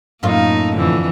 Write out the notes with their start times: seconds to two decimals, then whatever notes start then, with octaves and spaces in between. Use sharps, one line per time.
0.23 F#2 A2 A#3 D#4 F4
0.76 F2 D3 E3